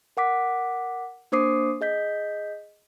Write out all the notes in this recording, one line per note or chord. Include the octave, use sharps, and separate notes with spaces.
A#4 F#5 D6 B6
A#3 D4 C5 D6 D#6 C7
G#4 D#5 G6 B6